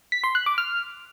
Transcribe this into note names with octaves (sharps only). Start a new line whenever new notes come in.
B6
C6
F#6
D6
F6